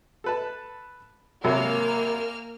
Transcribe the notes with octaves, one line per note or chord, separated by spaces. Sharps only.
A4 B4 A5
G#1 C3 F#3 A#3 F6